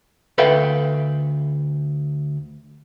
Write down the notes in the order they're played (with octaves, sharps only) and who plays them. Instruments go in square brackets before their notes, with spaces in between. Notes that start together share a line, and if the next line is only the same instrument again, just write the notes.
[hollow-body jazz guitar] D2 A4 B4 E5 F5 G5